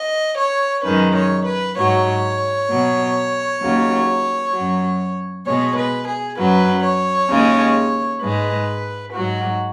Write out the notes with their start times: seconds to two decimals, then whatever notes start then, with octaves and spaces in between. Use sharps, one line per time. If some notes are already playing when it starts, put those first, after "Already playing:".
Already playing: D#5
0.38 C#5
0.84 F#2 D#3 G#3 B4
1.14 C#5
1.46 B4
1.76 G#2 F#3 C#5
2.68 B2 F#3
3.61 D#2 C#3 F#3
4.52 F#2 F#3
5.45 B2 G#3 C#5
5.75 B4
6.06 G#4
6.37 F#2 F#3 B4
6.83 C#5
7.29 D#2 C#3 G#3
8.21 G#2 G#3 B4
9.13 G#2 F#3 F#4